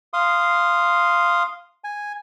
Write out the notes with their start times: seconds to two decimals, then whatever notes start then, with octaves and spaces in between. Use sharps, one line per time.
0.13 F5 C6 D#6
1.84 G#5